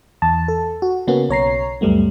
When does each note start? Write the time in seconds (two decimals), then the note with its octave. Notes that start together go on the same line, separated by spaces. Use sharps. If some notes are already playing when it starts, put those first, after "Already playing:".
0.22 E2 A5
0.48 A4
0.82 F#4
1.07 C#3 A#3 B3 C#4 F#4
1.29 B1 C#5 A#5 C7
1.81 C#2 F#2 G3 A3 B3